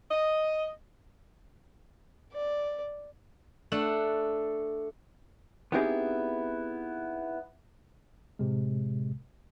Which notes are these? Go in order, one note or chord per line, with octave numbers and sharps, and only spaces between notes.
D#5
D5
A3 D4 A4 F#5
B3 C4 D#4 E4 G4 G#4
A2 C3 G#3